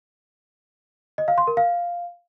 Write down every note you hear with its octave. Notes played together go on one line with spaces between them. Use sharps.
D#5
F5
C6
A#4
F5